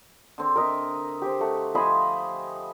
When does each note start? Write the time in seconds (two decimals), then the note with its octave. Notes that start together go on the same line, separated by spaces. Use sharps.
0.38 D3 C4
0.56 A#4 D#5 E5
1.22 G4 C5
1.41 A3 F#4
1.75 F3 D#5 G#5 B5 C6